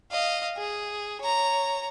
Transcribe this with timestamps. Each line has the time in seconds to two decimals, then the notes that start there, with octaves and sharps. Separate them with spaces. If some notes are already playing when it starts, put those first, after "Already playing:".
0.12 D#5 F5
0.57 G#4
1.21 C#5 A#5